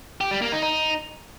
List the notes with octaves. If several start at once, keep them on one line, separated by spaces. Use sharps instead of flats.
G4
G3
A#3
D#4
D#4